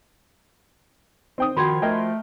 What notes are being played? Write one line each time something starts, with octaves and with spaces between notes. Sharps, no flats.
C4 G5 D#6
D#3 F3 F#4 C5 B5 C6 G#6
A3 A#4 D#5 G5